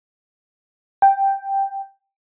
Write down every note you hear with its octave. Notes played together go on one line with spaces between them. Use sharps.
G5